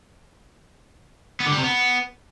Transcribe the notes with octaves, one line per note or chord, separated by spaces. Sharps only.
B3
D3
G3
C3
B3